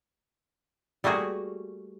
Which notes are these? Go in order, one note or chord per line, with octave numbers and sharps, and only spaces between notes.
G3 A3 A#3 F#4 G#4